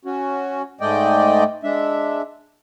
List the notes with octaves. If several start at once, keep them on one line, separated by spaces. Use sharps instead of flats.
C#4 F#4
G#2 G#3 A3 D5 D#5 G5
G#3 D4 E5